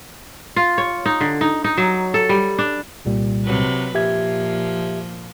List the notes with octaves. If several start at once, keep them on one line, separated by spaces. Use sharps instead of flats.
F4
C#5
D#4
D3
D#4
D#4
F#3
A4
G3
D4
C2 A#2 G3
C3 F#3 B4
A#2 F3 G4 E5 G#6